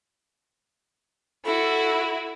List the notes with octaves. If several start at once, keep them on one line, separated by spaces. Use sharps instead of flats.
E4 F#4 A4